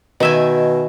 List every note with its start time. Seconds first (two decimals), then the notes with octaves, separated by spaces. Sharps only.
0.20 B2 D#3 E5 G#5